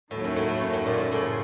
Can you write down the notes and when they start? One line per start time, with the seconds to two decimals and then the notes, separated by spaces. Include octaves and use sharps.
0.11 D#2 A2 D#3 F#3 A3
0.24 F#2
0.36 A2
0.49 A2
0.61 F#2
0.73 A2
0.86 A#2
0.98 A2
1.11 A2 C#3 F3